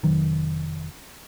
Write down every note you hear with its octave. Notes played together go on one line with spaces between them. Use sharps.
F1 D#3 F#3